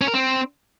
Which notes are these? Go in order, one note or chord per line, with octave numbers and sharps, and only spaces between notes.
C#4
A#4
C4